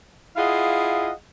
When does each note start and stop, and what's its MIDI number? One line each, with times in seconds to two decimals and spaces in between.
0.37 1.11 64
0.37 1.11 65
0.37 1.11 68
0.37 1.11 75
0.37 1.11 77
0.37 1.11 78